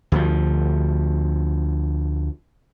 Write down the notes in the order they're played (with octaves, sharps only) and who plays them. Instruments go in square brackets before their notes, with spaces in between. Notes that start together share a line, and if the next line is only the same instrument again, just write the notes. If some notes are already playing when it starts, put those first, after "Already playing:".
[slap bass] D2 F3